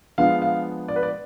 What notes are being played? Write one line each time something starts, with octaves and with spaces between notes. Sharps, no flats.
F3 G#3 B3 D4 F5
F5
D5
B4
D5